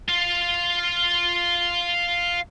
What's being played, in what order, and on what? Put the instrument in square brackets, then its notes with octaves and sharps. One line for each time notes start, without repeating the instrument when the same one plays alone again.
[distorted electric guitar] F4 F5